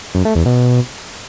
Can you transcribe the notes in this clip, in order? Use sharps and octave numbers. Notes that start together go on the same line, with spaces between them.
F#2
A3
E2
B2